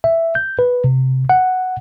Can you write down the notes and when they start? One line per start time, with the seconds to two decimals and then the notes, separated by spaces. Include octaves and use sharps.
0.04 E5
0.35 G6
0.59 B4
0.84 C3
1.30 F#5